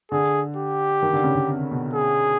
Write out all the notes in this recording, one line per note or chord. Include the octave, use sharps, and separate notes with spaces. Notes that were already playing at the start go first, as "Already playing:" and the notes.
D3 G#4
G4
D#3
D3
C#3
D3
C3
B2
G#4